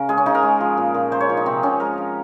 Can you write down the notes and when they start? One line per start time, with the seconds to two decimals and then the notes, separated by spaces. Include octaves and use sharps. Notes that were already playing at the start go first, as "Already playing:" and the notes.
Already playing: C#3 A#4
0.09 G#3 G#4
0.17 C#4
0.26 C#3 D#4
0.35 A#4
0.43 G#3
0.60 F3
0.77 A#2
0.94 A#2
1.12 G#3 C5
1.20 C#5
1.29 F3
1.37 D#4
1.46 C3 C4
1.63 C3 C#4
1.80 G#3 A#4
1.98 F3